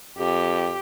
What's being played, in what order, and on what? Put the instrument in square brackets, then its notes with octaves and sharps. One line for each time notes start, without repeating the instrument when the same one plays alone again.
[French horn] F2 [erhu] G4